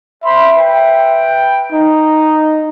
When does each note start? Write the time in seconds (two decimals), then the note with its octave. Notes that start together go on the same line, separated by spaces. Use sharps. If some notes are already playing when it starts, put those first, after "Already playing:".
0.24 C5 E5 B5 C6
0.57 B4 G5
1.72 D#4